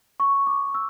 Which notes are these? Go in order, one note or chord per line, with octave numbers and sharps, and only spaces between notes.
C#6
D6
E6